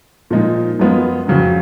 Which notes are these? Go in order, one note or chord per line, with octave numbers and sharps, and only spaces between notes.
A#2 F3 G#3 D#4
F#2 F3 G#3 B3 F4
F2 C#3 F#3 C#4